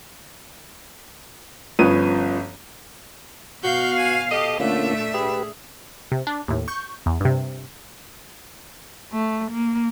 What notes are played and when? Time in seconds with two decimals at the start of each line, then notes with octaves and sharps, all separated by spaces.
1.79 G1 F3 C#4 B4 D#6 D#7
3.64 B2 F#4 F5 G6
3.97 G#5
4.31 G4 A4 D#5 D#6
4.60 A#2 D3 A3 A#3 C#4 D4 F4 E5
5.14 G4 G#4 B4
6.12 C3
6.27 D4
6.48 D#2 A2
6.68 C#6 G6
7.06 E2
7.21 G2 C3
9.13 A3
9.51 A#3